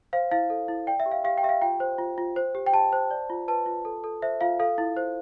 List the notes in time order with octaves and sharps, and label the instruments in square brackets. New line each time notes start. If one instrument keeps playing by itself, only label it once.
[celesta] C5 F5
E4 F5
A4
E4
D5 G5
E5
G4
F5
G4 F5
G5
G4 E5
F5
F4 G5
C5
F4
F4
C5
G4
G5
G4 A5
C5
D5
F4
B4 A5
F4
A4
A4
C5 E5
F4 F5
A4 F5
E4
C5